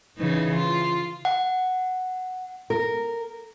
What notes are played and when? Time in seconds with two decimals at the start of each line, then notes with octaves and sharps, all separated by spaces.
0.17 C#3 E3 D#4
0.55 F4
1.25 F#5
2.70 A#4